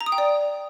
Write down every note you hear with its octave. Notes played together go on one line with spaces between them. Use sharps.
A#5
D#6
G5
D5